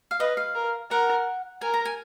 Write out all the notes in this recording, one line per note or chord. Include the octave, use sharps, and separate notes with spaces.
F5
B4 D#5
F5
A#4
A#4 F#5
A#4 G#5
A#5
G#5